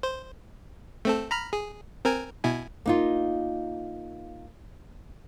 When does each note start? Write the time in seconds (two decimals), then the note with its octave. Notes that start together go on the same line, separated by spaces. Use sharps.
0.03 C5
1.05 A3 C4 A4
1.31 A#5 B5 F6
1.53 G#4
2.05 C4 A#4 G#5
2.44 B2 E4 G#5
2.86 A#3 D#4 F4